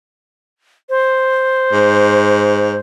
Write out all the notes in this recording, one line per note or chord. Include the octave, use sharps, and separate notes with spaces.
C5
G#2